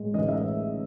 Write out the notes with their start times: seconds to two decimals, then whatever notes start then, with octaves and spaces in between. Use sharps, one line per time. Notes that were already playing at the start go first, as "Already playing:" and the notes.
Already playing: A2 G#3
0.14 A1 D#5
0.29 E5